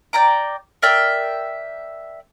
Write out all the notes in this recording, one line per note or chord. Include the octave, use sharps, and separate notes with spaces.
D5 G5 A#5 D6
A#4 D5 E5 G5